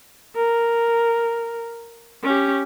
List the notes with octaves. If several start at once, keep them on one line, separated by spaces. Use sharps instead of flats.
A#4
C#4 G4